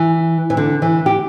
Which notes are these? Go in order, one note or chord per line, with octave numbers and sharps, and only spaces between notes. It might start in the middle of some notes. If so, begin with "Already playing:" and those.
Already playing: E3
E3
D3
E3
G4